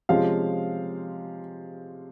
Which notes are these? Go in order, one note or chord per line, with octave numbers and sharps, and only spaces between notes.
C3 F3 G#3 C#4 F5